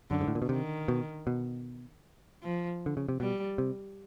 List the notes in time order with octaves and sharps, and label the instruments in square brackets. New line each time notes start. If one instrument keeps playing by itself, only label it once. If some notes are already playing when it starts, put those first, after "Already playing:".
[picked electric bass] F#2 [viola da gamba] D3
[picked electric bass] G#2
A2
A#2
B2
[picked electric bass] C3 [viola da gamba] D#3
[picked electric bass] B2
B2
[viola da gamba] F3
[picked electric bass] D3
C#3
C3
[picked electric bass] B2 [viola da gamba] G3
[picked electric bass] C3